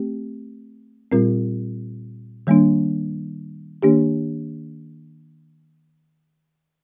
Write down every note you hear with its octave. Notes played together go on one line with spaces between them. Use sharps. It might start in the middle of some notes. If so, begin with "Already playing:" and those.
Already playing: A3 C4 G4
A#2 G3 C4 F4 A#4
D#3 G3 A#3 D4
D#3 A#3 D4 G4